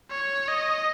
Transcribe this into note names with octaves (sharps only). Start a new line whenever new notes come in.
C#5
D#5